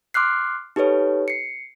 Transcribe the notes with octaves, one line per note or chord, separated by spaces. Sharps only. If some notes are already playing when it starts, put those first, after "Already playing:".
C6 D6 F6 F#6 C7
D#4 G4 A4 B4 C#5
C7 C#7